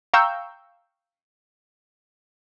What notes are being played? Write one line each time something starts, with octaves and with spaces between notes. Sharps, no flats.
F5 G5 A#5 C#6 E6 G6